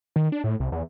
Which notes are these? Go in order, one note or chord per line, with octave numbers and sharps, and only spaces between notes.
D#3
D4
A2
C2
E2